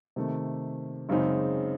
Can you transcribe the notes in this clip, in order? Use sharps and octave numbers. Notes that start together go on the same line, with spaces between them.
C3 D#3 A3
F#2 C#3 G#3 C4 D#4